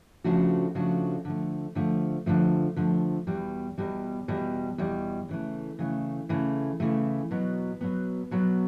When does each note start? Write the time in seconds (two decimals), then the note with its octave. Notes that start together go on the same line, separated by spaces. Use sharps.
0.24 C#3 F3 A3 D4 F#4
0.75 C#3 F3 A3 D4 F#4
1.25 D3 F3 A3
1.75 D3 F3 A3
2.26 D3 F3 A3
2.76 D3 F3 A3
3.27 E2 B2 G3
3.78 E2 B2 G3
4.28 E2 B2 G3
4.78 E2 B2 G3
5.29 C#3 E3 A3
5.79 C#3 E3 A3
6.29 C#3 E3 A3
6.80 C#3 E3 A3
7.31 B2 F#3 B3
7.81 B2 F#3 B3
8.31 B2 F#3 B3